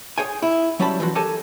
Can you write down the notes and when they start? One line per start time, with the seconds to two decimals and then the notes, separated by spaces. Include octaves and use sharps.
0.18 G#4 C#5 G5 G#5
0.42 E4
0.80 F#3 G3 C#4 C#5 A5 B5
1.00 E3 F3 F4 F#4
1.15 G4 A4 A#4 C#5 G#5 A5